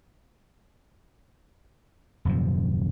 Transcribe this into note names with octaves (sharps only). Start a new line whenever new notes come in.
D#1 F#2 C3 F3